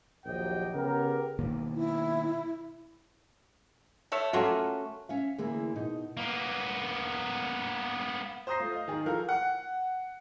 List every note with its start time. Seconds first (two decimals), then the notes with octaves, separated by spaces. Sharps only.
0.25 A#1 D#2 F#3 G4 D#5 G5
0.74 C#3 B3 G4 A#4
1.39 B2 D#3 A#3
1.75 E4
4.12 A3 C#5 E5
4.33 F#3 A3 A#3 C#4 F4 F#4
5.09 C#4 E5 F5
5.38 D2 E3 A#3 E4 G#4
5.75 B2 D#4
6.17 A#3 B3
8.47 C5 A#5 D#6 G6 A#6 C7
8.59 A3 F4
8.72 D#5 F5
8.88 D#3 G#4 A#4
9.06 E3 F3 A4 A#4 F5 F6
9.29 F#5